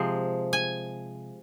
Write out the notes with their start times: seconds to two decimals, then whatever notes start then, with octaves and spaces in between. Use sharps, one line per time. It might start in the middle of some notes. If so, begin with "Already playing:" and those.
Already playing: C3 F3 G#3
0.53 G#5